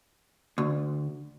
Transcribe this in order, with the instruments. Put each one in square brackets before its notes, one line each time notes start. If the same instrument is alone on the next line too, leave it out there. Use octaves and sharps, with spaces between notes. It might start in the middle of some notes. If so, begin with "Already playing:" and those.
[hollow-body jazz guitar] D2